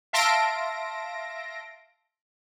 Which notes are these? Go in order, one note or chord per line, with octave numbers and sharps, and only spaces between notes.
E5 F5 A5 C6 A#6 D7